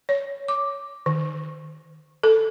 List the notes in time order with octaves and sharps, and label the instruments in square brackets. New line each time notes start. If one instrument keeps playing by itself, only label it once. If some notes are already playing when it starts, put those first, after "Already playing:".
[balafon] C#5
D6
D#3
A4